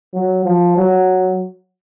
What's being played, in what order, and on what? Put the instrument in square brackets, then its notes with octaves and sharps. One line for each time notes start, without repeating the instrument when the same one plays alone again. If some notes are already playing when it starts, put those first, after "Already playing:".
[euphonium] F#3
F3
F#3